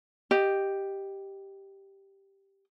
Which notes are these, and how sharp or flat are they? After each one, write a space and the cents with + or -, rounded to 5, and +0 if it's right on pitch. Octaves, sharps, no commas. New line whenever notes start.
G4 +0 D#5 -5